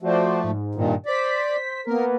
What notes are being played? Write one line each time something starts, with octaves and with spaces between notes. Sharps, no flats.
F3 A3 F#4 C5 D5
G#2
G2 A#2 D#3
C5 D5 B6
A#3 B3 A#4